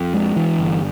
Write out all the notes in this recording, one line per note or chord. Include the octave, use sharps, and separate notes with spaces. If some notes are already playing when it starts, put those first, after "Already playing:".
Already playing: F2
G#3
E3
G1